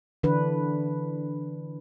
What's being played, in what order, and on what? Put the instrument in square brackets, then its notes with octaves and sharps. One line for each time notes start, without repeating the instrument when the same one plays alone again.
[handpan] D3 E3 D4 B4